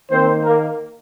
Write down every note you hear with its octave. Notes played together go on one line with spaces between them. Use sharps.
D#3 A#3 C4 C5
A#3 A#4